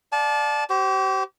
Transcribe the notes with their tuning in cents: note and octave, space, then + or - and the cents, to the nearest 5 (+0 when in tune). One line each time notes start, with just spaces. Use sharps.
D5 +5 F5 +40 A5 -25
G4 -40 C5 +0